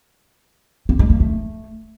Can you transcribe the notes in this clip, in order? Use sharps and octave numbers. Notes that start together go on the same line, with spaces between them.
C4
G#3
A#3
A3